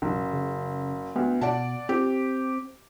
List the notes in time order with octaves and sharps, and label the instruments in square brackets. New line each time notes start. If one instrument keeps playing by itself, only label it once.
[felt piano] F#1 [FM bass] B1
[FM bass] C#3
[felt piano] D2 [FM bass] B3
[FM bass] B2 [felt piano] D5 F#5 A5
[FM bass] C4 [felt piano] G4